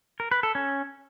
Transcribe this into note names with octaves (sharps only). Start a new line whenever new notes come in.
A#4
B4
A4
C#4